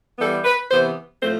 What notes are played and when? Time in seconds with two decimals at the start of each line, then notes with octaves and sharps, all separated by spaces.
0.17 E3 G3 B3 A4
0.44 B4
0.70 C3 E3 B3 C5
1.21 A2 F3 A3 C5